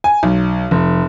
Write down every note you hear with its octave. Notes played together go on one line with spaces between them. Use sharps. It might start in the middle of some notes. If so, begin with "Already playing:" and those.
G#5
B1
F1